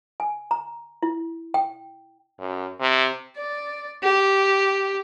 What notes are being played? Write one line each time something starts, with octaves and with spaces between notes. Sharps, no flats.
G#5
A#5
E4
G5
F#2
C3
D5
G4